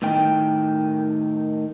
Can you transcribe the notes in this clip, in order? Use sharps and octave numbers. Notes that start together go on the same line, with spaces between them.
A2 D#3 G5